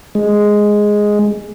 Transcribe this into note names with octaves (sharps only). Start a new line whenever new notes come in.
G#3